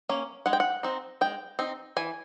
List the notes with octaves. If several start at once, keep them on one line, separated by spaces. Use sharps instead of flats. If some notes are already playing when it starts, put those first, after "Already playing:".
A#3 C#4
G#3 F#5
G5
F#5
C4 D#4
G#3 G5
C4 D#4
E3 G#5